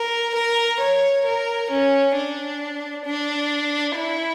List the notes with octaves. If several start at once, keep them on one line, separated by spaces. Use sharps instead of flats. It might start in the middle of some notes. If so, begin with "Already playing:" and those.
Already playing: A#4
A#4
C#5
A#4
C#4
D4
D4
E4